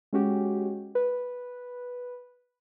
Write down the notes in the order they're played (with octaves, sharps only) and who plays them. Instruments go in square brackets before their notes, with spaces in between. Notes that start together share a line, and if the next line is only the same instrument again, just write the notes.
[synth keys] G#3 C#4 F#4 G4
B4